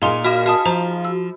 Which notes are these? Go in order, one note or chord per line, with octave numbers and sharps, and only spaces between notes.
A#2 D#4 F4 G#4 A#4 A#5 C6 F7
F#4 F5
F#4 F5 A5 D#6
F3 C5 A#5
E6